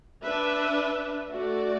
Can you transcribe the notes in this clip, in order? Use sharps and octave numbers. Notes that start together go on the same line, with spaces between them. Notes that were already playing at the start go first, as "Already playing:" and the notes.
D4 B4 E5
A3 F#4 D5